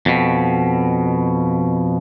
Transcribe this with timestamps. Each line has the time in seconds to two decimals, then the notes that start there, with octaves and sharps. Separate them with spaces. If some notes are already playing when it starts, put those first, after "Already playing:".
0.06 F2 B2